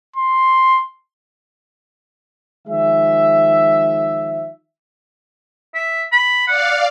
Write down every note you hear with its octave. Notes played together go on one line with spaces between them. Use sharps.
C6
D#3 F3 G#3 E5
E5
B5
D5 F5 F#5